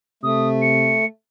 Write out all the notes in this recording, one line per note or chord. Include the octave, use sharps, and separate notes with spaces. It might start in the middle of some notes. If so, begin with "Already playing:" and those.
C3 A3 D#6
C#7